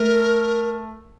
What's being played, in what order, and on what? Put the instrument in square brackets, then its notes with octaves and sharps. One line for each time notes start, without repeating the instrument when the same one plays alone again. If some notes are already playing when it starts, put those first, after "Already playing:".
Already playing: [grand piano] A3 [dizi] A#4